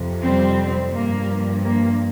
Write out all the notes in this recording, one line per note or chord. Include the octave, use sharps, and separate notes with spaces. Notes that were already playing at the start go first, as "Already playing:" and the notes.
Already playing: F2 C3
G3 C4
G2 F3 A#3
A#3